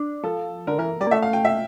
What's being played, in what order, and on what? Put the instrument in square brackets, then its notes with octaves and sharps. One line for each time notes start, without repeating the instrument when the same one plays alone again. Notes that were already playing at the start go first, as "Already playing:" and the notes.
Already playing: [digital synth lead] D4
[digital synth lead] F3 [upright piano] A4
[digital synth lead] D3 [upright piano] A#4
[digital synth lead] E3 [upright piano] A#4
[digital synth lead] G3 [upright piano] D5
[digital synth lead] A#3
[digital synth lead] A3 [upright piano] E5
[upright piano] F5
G5
E5